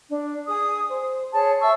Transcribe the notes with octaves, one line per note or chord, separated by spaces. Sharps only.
D4
G#4 D#6
C5
G#4 C#5 A5
E5 A5 C#6 E6